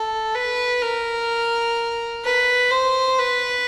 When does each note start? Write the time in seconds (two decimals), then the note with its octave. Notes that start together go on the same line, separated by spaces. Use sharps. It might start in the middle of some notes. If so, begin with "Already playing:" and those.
Already playing: A4
0.35 B4
0.82 A#4
2.25 B4
2.71 C5
3.19 B4